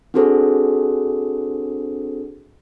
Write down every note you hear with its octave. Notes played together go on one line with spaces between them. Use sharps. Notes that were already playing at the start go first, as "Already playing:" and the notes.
C4 D4 F#4 G#4 A4 C5